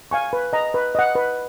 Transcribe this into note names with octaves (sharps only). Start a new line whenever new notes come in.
F5 G#5 C#6
B4
D#5 A#5
B4
D#5 F#5
B4